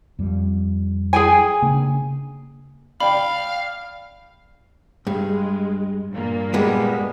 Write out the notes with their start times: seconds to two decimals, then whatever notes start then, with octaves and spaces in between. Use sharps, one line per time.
0.19 F2 G3
1.13 G#4 G5 G#5
1.62 C#3 A#3 D4
3.00 D5 F5 G5 B5
5.07 G2 G#3
6.11 G2 A#2 A#3
6.54 G3 G#3 B3